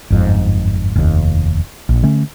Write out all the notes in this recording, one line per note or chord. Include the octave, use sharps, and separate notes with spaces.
G1 F2 G#2
F1 D#2
A#1
D3 A3 C#4